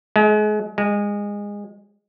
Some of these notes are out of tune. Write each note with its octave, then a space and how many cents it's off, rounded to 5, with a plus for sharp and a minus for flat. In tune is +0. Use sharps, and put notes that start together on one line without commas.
G#3 +35
G#3 -20